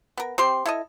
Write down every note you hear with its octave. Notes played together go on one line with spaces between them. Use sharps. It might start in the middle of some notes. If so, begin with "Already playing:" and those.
B3 A#4
C4 G4 C6
E4 A4 D#5